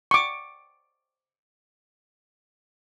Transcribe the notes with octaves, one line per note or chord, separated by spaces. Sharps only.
C#6 D6